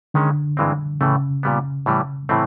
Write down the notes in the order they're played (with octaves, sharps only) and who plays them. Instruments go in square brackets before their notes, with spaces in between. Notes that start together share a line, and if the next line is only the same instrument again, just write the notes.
[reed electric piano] D3 [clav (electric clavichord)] D#3 G#3 C#4
[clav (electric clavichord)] G2 E3 G#3 C4
[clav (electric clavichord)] A2 E3 A3 [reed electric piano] C#3
[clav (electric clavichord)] A#2 G3 B3
A2 E3 G3
A2 E3 A3 C4